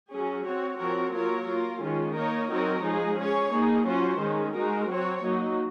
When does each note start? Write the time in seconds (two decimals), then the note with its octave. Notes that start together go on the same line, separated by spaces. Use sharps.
0.12 F#3 C#4 G#4
0.46 C4 F#4 C#5
0.79 F3 C4 F#4 A#4 C#5
1.13 F#3 A#3 F4 A#4 C#5
1.47 A#3 F4 A#4
1.81 D#3 G#3 C#4 F4
2.16 A#3 D#4 A#4 C#5
2.50 F#3 C4 D#4 A#4 C#5
2.84 F3 G#3 D#4 G#4
3.18 C#4 G#4 C#5
3.52 A#3 D#4 G#4
3.86 F#3 C#4 F4 C5
4.20 D#3 G#3 C#4
4.54 G#3 D#4 F#4 A#4
4.88 F#3 C4 F#4 C#5
5.22 F#3 A#3 D#4